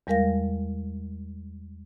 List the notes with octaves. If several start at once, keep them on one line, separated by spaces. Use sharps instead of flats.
E2 G3 G#3 A#4 F5 A#6